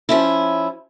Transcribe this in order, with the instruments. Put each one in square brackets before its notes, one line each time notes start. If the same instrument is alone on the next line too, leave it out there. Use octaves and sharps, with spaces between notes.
[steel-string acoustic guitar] F3 C#4 E4